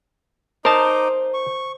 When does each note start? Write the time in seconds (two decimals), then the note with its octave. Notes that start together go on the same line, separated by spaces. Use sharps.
0.65 D#4 A#4 C5 D#5 A5 D6
1.34 C#6